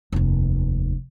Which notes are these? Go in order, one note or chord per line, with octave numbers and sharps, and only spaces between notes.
F1 D#2